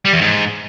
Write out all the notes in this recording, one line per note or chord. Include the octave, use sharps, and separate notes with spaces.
G3
E2
G#2